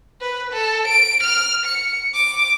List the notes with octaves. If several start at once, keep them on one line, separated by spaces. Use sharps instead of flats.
B4
A4
D7
F6
C#7
D6